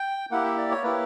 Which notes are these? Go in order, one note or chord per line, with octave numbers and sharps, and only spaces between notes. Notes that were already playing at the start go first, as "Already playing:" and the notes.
Already playing: G5
A#3 E4 G4 F#5
E5
D5
C#5
A#3 E4 G4 B4